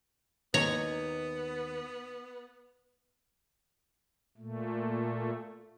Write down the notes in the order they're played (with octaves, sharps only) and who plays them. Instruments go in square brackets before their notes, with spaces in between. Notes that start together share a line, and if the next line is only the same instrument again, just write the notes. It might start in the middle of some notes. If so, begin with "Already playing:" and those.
[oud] D#2 D#4 [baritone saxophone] B3 [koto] C#5 A#5
[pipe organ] A#2 A3